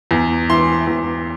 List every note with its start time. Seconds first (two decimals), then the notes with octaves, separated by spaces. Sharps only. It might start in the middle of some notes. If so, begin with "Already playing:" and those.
0.11 E2
0.49 E3 C6
0.87 E2